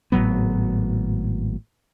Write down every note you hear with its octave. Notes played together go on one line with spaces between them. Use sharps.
G#1 A2 F#3 B3